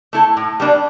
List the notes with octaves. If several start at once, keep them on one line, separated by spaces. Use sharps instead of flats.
A3 E4 A4
A2
G3 A#3 D4